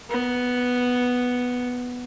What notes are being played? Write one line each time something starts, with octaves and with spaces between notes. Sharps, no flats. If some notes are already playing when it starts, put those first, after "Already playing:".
B3